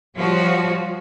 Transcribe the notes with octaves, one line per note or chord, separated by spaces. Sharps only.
F3 G3 F4 F#4 C#5